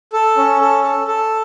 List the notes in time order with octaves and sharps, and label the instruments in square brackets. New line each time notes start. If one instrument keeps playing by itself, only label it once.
[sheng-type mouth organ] A4
C#4
A4
A4
A4